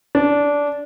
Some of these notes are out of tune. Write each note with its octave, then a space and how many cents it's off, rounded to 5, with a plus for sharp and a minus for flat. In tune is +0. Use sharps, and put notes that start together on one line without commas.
D4 -15